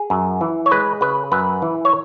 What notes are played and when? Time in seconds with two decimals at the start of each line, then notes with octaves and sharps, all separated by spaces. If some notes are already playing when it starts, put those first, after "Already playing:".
Already playing: G#4
0.10 F#2
0.41 E3
0.66 C#5
0.71 G#3 B4
1.01 C#3 B4
1.32 F#2 B4
1.62 E3
1.85 C#5